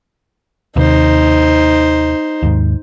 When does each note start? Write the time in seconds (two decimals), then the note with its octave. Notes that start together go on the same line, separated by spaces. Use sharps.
0.76 D#2 C3 D#4 C5
2.43 D#2 G#2